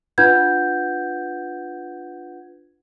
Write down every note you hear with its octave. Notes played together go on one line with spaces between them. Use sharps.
D4 F4 B4 F#5 G6 G#6